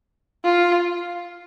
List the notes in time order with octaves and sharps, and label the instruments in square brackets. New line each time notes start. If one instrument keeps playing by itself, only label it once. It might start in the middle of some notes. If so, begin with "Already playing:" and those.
[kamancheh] F4